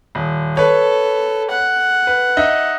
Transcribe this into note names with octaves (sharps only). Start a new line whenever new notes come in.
D#1
A4 B4 C#5
F#5
B4
D#4 D#5 E5